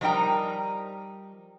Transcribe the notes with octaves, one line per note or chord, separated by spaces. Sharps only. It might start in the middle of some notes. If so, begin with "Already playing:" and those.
F3 G3 D#4 A#4 G5 A#5